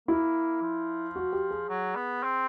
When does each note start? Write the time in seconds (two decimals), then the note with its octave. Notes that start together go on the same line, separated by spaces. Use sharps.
0.08 A#3 E4
0.62 F3
1.16 F#4
1.33 G4
1.51 G#4
1.69 F#3
1.95 B3
2.23 C4